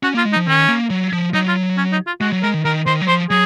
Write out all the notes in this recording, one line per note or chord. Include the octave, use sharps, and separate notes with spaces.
C#4 F#4
A#3 F4
G#3
D#4
F3
D#3 C#4
A#3
F#3
F3
F#3 D#4
F4
C#4
D#4
F4
G#3 F#4
F#3
G#3 A#4
D#3
D#3 A#4
D#3 C5
F#3
F3 C5
F#3 G#4